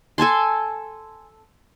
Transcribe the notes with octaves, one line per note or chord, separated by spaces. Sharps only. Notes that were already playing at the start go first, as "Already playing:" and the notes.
A4 G#5 A5 C6